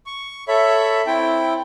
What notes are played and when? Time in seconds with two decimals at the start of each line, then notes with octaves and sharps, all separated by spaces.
0.06 C#6
0.48 A4 C#5 E5 B5
1.07 C4 E4 G5